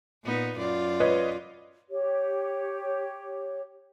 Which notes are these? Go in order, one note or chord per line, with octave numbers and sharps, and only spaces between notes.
A#2 B3 D#4
F#2 F4 D5
B4 C#5 D#5
G4 C#5